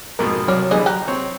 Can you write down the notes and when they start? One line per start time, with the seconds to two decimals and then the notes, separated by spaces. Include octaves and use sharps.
0.19 F2 G#2 B2 A#4
0.48 C2 F#3 C#5 D5 F6
0.71 D3 E3 G3 G#3 G#4 D#5
0.86 G4 A#5 F#6
1.08 C4 C#5